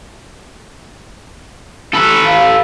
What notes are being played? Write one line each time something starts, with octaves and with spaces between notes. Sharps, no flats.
A4 B4
F5